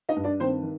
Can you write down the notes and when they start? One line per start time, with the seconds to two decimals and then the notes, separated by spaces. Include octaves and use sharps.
0.09 D#4 D#5
0.16 G2
0.24 D4 D5
0.40 D#3 C4 C5
0.63 D#3